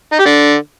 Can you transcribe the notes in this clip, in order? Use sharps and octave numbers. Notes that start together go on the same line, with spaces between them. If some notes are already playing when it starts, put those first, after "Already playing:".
D#4
G4
D3